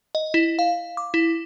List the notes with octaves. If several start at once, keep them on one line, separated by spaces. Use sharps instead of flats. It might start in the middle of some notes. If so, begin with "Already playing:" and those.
D#5
E4
F5
D6
E4